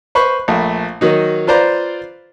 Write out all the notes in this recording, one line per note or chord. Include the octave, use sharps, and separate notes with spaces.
B4 C5 B5 C#6
A#1 A3
D#3 F#3 D#4
F4 B4 C5 D5 A#5